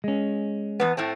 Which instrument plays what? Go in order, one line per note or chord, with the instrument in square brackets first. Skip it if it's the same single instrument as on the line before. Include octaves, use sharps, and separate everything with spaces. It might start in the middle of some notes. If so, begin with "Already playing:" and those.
[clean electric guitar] G#3 C#4
[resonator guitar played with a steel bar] E2 B3
A2 A3 C4